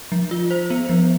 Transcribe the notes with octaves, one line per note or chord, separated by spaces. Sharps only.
F3
F4
C5
B3
F3